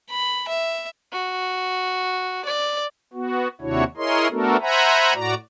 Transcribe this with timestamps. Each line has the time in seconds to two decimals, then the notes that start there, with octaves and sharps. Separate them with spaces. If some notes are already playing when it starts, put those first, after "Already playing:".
0.10 B5
0.48 E5
1.12 F#4
2.45 D5
3.13 B3 F#4
3.61 D#2 C3 D4 E4 F#4 C#5
3.97 E4 G#4 A#4 C#5 D#5 C6
4.30 A3 B3 D4 F#4 A4 A#4
4.61 C5 E5 F#5 G#5 A#5 B5
5.14 A2 F#4 D5 A#5